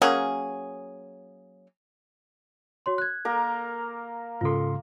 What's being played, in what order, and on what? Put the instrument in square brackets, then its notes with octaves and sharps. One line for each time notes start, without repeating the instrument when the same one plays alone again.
[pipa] F#3 A#3 C#4 G#4
[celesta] F#4 C#5 C6
F#6 G#6
[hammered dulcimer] A#3 A#4 A#5
[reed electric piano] G#2 C#3 C6 [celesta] F4 A4